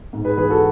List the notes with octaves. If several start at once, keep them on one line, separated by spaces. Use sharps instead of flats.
G#2
G#4 B4
E3 G#4 B4
F#4 A4